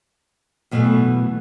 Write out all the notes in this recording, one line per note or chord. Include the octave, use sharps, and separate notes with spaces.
F#2 B2 E3 G3 A3